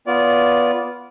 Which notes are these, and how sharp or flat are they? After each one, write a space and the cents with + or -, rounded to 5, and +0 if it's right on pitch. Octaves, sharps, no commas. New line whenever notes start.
B3 -10 F4 +0 D5 -25